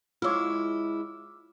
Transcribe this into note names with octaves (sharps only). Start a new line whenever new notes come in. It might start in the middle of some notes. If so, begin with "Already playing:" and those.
G#3 E4 F4 C#5 D6 E6 F6